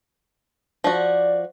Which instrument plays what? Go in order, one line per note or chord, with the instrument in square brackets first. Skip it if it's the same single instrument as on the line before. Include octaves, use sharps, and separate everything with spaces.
[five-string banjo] F3 F#4 [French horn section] D5